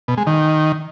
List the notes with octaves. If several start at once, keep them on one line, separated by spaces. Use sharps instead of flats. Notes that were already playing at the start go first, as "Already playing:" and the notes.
B2
G#3
D#3